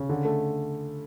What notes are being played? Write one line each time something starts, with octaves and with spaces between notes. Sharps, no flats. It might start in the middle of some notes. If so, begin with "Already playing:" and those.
Already playing: C#3
D3
A3